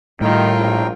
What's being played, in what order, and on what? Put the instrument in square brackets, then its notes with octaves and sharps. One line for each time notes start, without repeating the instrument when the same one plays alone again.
[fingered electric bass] A2 [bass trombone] D#3 [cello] G3 F4 [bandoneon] A#4 G5
[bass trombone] A#1